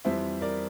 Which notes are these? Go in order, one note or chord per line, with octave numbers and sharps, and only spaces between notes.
F2 E3 G3 C5 E5
A#4 D5